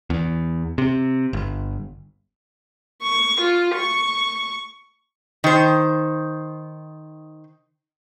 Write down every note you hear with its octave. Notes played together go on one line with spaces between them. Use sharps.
E2
C3
G1
C#6
F4
C#6
D#3 C5